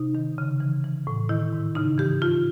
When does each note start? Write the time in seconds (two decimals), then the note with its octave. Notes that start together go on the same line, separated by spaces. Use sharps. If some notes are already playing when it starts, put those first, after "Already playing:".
Already playing: C3 D#4
0.15 D#3
0.38 C#3
0.60 E3
0.84 E3
1.07 A2
1.29 D#3 E4
1.53 G#2
1.75 C#3 D#4
1.98 E3 G4
2.22 E3 F4